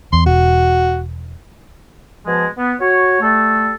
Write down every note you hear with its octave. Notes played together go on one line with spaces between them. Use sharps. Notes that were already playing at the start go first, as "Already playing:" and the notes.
E2 C6
E1 F#4
B2 F3 G#3
B3
F#4 C#5
G3 A3 A4